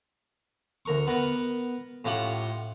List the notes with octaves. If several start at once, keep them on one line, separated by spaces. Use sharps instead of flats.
D2 A#4 C#6
B3 A#4 B4
A2 C#4 F4 G4 F#5 G5